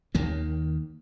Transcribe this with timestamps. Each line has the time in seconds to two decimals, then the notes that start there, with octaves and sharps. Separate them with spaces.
0.15 D#2 D#3 A#3